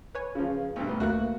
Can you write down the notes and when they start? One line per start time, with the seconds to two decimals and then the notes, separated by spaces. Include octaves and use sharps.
0.15 B4 C#5 G#5
0.35 C#3 F3
0.76 B1 G2
0.88 A1 B3
1.00 D2 A3 A#3 F#4 F#6